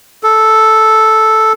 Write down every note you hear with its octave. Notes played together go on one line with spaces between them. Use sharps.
A4